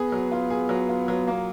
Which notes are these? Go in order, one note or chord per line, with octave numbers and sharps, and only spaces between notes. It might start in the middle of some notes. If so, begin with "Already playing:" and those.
Already playing: B3 G#4
F#3
F4
G#4
F#3
F4
F#3
A#3